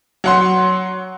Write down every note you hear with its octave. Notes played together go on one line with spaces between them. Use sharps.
F#3 F#5 C6